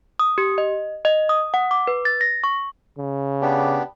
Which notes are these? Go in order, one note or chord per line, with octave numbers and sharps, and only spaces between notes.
D#6
G4
D#5
D#5
D#6
F#5
D6
B4
A6
A#6
C#6
C#3
B3 D4 G4